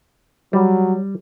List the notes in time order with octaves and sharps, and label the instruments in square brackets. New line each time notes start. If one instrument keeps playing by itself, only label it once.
[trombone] F#3 [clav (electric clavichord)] G3